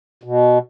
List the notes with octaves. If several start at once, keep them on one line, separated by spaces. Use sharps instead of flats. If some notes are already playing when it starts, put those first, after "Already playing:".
B2